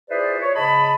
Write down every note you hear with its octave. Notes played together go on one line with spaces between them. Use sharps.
E4 F4 G#4 B4 C5 D5
C#5
G#2 C#3 D#5 A5 B5